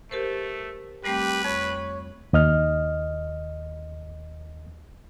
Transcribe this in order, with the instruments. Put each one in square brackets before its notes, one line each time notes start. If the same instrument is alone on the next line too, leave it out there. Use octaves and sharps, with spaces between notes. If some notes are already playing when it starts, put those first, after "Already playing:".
[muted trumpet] A3 [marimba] G4 A#4 C5
[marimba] G3 A3 C4 [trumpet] G4 [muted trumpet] B4
[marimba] F2 B5 [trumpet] C#5
[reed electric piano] D#2 D#5 F6